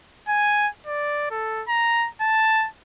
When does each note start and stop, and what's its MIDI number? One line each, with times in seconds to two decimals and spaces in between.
0.28 0.68 80
0.87 1.29 74
1.31 1.63 69
1.68 2.08 82
2.21 2.67 81